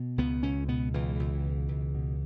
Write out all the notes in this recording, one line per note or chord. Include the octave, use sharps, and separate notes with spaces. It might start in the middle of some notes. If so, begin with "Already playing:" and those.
Already playing: B2
C#2 B3
C#2 C#4
B2 B3
C#2 E3
C#2
B2
C#2
B2